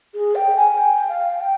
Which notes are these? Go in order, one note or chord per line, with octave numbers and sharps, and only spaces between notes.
G#4
G5
G#5
G5
F5
G5